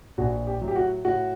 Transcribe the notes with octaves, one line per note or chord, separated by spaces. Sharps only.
A#1 F#4
G4
A2 F#3
G4
F#4
A2 F#4